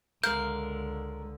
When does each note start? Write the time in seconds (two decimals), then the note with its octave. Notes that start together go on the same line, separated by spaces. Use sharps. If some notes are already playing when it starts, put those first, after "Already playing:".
0.23 C#2 D3 G#3 A#4 F5 G6